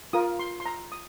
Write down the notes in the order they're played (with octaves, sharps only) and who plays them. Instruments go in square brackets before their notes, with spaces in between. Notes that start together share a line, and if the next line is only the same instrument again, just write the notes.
[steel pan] F4 A#4 D#6
C6
C6
A#5
D#6